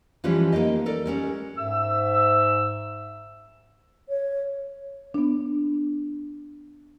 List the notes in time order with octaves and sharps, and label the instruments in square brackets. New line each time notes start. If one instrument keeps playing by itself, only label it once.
[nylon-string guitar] E3 F3 G3 G#3 C#4
A#3 D#4 G4 D#5
A4 A#4 D5
G3 G#3 C#4
[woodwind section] G#2 E5 E6
[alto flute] C#5
[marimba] B3 D4